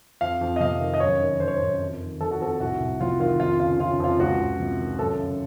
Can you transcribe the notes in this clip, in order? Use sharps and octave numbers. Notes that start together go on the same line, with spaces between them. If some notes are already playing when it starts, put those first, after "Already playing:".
F2 F5
F2
D#5
C3 F5
D#3
D#5
F#2 C#5
D#3
D#3 C5
C#5
C5
F#2
F2
D#3
D#3 A4
F#4
F2 A4
C2 F#4
C2
C3 F4
D#3 F4
F2 F4
C#3 F4
C#3 F4
F2 F4
C#2 F#4
C#2
C3
D#3
F#2 A4
C#3